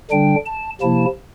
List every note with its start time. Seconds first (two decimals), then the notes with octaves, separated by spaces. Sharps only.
0.11 D3 G3 D4 G5
0.46 A5
0.81 C3 F3 A#3 E4 A5